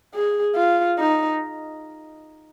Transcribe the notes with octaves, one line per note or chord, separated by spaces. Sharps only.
G#4
F4
D#4